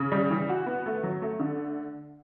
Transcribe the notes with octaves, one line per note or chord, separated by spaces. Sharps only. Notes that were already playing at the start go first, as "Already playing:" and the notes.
Already playing: C#3
G3
E3
F#4
B3
A3
F#3
A3
D3